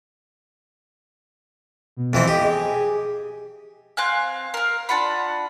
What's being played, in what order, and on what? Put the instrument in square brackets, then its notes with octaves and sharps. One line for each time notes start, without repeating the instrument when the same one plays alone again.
[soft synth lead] B2
[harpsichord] F2 E3 C4
[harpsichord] G4 [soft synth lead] D#5
[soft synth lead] G#4
[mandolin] C4 F5 G#5 F#6
A#4 F5
D4 F4 F#5 B5